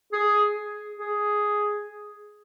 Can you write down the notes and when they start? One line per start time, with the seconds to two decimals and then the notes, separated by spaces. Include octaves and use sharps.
0.13 G#4
0.96 G#4